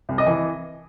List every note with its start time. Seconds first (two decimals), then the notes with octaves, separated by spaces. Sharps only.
0.09 C2
0.18 D#5
0.26 E3